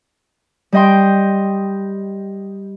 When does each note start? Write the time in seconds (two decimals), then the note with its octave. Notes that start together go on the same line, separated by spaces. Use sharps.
0.72 G3 G4 D#5 G5 C6